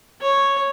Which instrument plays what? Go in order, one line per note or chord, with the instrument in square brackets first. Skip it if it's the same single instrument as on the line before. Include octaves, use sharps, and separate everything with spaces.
[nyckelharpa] C#5